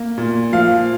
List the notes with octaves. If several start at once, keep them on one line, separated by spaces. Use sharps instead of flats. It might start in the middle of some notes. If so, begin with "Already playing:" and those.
Already playing: A#3
A#2
F3 F5